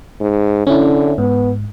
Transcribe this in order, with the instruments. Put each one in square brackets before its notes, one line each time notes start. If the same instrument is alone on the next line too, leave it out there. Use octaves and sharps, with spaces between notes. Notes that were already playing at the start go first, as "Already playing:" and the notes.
[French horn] G#2
[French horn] D3 [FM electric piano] C#4 E4
[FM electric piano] G#2 [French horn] B3